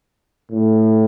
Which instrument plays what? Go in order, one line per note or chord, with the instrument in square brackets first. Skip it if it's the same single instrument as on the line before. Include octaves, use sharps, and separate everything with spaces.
[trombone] A2